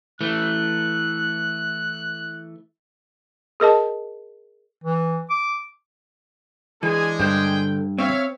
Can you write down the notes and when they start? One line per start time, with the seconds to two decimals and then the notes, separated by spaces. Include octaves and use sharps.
0.21 E3 A3 F#6
3.60 G#4 A#4 D#5 A5
4.84 E3
5.30 D6
6.83 E3 G#3 D4 G#4 G#5
7.20 G2 D3 C5 G5
7.98 C4 C#5 E5 F5